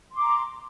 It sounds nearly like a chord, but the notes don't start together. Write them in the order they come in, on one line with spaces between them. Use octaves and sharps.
C6 D6 A#5